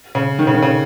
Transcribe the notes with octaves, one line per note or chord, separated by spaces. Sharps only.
C#3
D#3
C#3
D#3
C#3